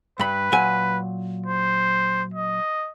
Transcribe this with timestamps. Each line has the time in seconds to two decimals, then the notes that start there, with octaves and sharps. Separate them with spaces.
0.19 G2 B4 B5
0.52 A#2 F#3 G#5
1.46 C5
2.34 D#5